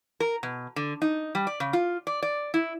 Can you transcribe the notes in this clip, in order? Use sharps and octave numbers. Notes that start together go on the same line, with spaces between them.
A#4
B2
D3
D#4
G3
D5
C#3
F4
D5
D5
E4